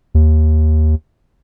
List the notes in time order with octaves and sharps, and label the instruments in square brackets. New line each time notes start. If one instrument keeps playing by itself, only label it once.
[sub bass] D#2